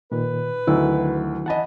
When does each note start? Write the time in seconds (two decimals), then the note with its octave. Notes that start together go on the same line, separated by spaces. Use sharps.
0.12 A#2 D#3 B4
0.67 D2 D3 D#3 F#3 E4
1.46 E3 D#5 F#5 A5 B5